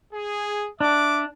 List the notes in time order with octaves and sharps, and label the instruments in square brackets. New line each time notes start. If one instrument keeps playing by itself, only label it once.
[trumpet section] G#4
[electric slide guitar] D4 [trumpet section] E5 D6